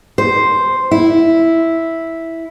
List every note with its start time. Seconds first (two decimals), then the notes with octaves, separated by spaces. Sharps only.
0.18 C5
0.91 E4